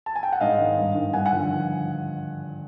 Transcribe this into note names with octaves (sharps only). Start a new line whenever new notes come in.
A5
G#5
G5
F#5
G#2 D#5 F5
D#3
G2
D#3
G2 F#5 G#5
F#5 G#5
D3 F3